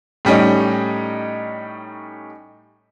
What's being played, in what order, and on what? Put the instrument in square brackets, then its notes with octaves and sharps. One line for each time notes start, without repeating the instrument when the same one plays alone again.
[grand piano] A2 G3 C#4 D#4